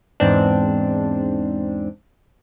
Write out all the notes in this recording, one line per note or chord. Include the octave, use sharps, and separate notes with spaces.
E2 G#2 C4 D4